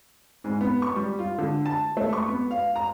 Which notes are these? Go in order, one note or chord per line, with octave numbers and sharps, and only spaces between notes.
G#2
B3
C#6
G3
F4
D3
A5
A3
C#6
B3
F5
A#5